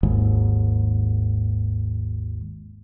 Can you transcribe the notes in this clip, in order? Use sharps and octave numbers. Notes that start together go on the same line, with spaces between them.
G#1 D#2 G#2